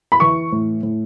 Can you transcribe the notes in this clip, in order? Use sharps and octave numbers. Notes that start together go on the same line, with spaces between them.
B5
E3 C#6
A2
A2